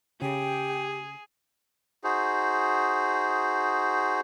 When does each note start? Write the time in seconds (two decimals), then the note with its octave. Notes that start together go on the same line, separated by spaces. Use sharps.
0.22 C#3 G4 G#4 G5
2.04 D#4 F#4 G#4 C5